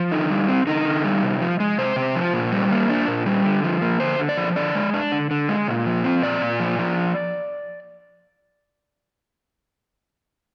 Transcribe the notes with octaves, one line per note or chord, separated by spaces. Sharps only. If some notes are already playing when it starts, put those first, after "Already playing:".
Already playing: F3
D3 D#4
G3
C4
D3 D#4
D3
G3
C3
F3
G#3
C3 C5
C3
F3
A#2
G3
A#3
D4
A#2
G3
D3
F3
A#3
D3 C5
D3
D5
F3
D3 D5
G#3
D4
D3
D3
G#3
A#2
F3
C4
A#2 D5
A#2
F3
F3